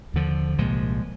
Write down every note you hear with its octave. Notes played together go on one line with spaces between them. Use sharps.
D#2 D3 F3
C2 A#2 F3 G#3